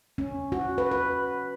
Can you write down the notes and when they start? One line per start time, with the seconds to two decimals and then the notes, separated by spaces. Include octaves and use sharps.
0.18 C#4
0.52 F#4
0.78 B4
0.91 B4